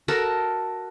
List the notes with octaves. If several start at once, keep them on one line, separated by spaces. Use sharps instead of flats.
F#4 A4 A#4 A5